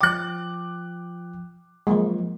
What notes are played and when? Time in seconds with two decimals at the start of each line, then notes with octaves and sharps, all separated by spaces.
0.01 F3 G5 D6 F#6
1.87 F3 F#3 G#3 A#3